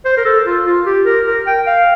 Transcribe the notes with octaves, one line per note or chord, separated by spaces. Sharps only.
C5
A#4
A4
F4
F4
G4
A#4
A#4
G5
F5